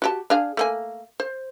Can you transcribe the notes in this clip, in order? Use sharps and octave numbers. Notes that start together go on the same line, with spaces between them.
F#4 G4 A5
D4 G#4 F5
A3 A#3 G#5
C5